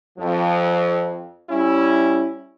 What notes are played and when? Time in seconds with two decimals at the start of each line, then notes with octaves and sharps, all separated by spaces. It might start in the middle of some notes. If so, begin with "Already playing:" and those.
0.17 F2 F3
1.49 G3 C#4 E4